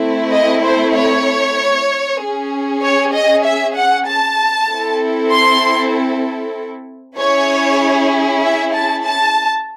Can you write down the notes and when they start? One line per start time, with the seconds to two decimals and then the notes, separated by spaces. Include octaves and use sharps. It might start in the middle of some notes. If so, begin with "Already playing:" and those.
Already playing: A3 C4 E4
0.32 D#5
0.63 C5
0.95 C#5
2.19 C#4 G#4
2.82 C#5
3.13 D#5
3.44 E5
3.75 F#5
4.06 A5
4.68 C4 E4 A4
5.31 C6
7.17 C#4 E4 G#4 C#5
8.41 E5
8.73 A5
9.04 A5